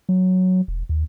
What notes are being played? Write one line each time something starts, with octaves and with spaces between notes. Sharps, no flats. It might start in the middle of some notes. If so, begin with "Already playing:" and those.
F#3
E1
D#2